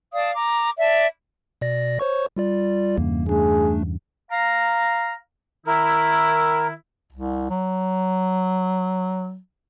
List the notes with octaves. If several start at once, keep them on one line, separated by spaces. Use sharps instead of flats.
D5 F5 A5 D#6
A#5 D6
D5 E5 A5
B2 D5 A#6
C5 C#5 C#6
G3 F4 D5
E2 G2 C#3 A#3
A3 D4 G#4
F5 A#5
D#3 E4 A#4
C2
F#3